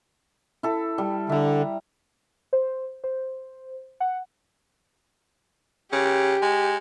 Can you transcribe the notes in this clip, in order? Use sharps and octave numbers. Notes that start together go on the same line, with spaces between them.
E4 A4
G3
D3 E5 A#5
C5
C5
F#5
C#3 G4
G#3